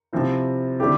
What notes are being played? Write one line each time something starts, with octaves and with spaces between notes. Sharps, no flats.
C3 F3 C4 E4
D3 A3 E4 G4